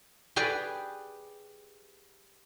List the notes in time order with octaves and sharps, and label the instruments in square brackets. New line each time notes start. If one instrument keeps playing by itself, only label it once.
[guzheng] G4 G#4 B4 D5